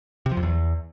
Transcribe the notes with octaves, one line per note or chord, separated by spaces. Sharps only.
C3
F3
F2
E2